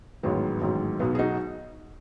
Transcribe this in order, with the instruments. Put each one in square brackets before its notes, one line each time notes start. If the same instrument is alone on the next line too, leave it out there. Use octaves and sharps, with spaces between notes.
[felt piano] A1 G#2 D#3 F#3 B3
A1 G#2 D#3 F#3
B1 B2 F#3 B3
G#4
D#4 F#4